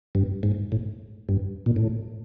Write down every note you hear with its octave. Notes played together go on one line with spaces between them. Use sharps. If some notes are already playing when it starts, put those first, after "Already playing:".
G2
G#2
A2
G2
A#2
A2